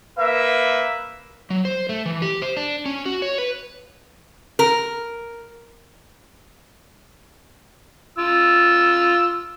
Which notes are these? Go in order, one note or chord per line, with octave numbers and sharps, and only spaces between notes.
A#3 B4 E5
F#3
C5
A3
E3
G4
C5
D4
C#4
F#4
C#5
B4
A#4
F4 E6